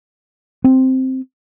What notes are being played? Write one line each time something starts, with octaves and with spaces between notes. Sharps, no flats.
C4